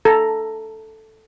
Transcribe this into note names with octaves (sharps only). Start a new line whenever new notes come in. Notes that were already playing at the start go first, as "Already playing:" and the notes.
A4 A#5